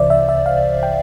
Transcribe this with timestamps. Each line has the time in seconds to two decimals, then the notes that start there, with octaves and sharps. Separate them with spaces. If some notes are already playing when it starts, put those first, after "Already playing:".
Already playing: C2 C3 E3 C5 D5 E5
0.10 E5
0.29 E5
0.46 F5
0.83 G5